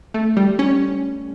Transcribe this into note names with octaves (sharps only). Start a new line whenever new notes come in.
A3
G3
C#4